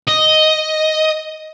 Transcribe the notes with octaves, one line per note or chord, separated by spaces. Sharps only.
D#5